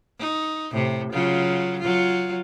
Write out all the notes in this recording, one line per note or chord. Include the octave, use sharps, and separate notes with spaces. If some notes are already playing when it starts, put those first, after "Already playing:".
D#4
A2 C3
C#3 F#3 F4
F#3 F4